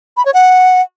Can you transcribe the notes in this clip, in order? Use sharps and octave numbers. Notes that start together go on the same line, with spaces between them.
B5
C#5
F#5